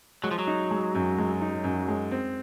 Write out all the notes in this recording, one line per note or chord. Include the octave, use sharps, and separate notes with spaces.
F#3 G#3
F3
F#3
D#4
G#3
F#2
G#3
D#4
F#2
G#3
C4